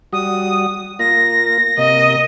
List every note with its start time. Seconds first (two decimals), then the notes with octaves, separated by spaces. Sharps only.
0.13 G3 F#4 D#6
0.99 A#3 F4 A#6
1.78 C3 A#3 D#5